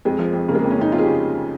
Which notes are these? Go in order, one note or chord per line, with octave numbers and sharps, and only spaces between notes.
F2 G#3
F3
F2
C#3 A#3
G#3
A#3
F2
C#4
F2 D#4
F2 F4
G#4
G4
C#3